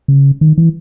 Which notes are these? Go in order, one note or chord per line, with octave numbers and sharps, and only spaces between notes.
C#3
D#3
E3